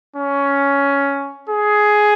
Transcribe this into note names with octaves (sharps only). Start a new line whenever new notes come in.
C#4
G#4